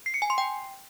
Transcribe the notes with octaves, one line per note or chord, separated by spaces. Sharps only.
C7
C#7
G#5
C6
G5